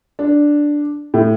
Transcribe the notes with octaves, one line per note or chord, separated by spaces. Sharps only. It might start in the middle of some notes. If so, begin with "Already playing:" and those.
D4
A2